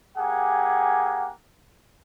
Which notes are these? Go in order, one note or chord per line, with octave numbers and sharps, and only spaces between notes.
A#3 G4 G#4 F#5 G#5